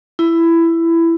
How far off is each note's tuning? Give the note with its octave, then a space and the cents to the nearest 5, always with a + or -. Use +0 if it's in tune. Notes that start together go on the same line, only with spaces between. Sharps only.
E4 +15